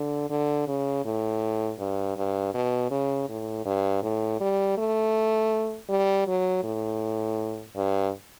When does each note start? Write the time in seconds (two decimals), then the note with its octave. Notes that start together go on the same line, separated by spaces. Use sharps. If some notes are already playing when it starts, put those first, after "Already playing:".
Already playing: D3
0.30 D3
0.68 C#3
1.06 A2
1.79 G2
2.17 G2
2.54 B2
2.91 C#3
3.29 A2
3.66 G2
4.03 A2
4.41 G3
4.78 A3
5.89 G3
6.27 F#3
6.64 A2
7.76 G2